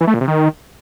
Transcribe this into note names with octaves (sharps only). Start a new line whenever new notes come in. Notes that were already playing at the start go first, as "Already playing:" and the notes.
E3
A3
A#2
C3
D#3